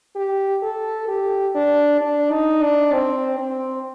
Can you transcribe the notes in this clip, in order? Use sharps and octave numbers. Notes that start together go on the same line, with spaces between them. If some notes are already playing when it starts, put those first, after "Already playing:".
G4
A4
G4
D4
D4
D#4
D4
C4
C4